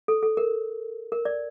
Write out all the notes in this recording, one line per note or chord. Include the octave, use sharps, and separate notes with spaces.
A4
A4
A#4
A#4
D5